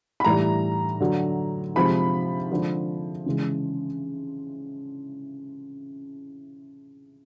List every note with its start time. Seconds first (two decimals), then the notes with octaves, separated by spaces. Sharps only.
0.20 B5
0.25 A2 E3 G3 A#5
1.00 D3 F#3
1.75 C3 F3 G#3 B5
2.51 D3 F3 G#3
3.26 C#3 E3 G#3